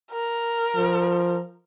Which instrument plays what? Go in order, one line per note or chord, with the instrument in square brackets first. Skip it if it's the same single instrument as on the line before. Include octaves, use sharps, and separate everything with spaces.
[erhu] A#4
[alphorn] F3